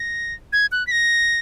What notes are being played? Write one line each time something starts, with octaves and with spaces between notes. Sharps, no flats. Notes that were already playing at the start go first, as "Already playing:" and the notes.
Already playing: A#6
G#6
F#6
B6
A#6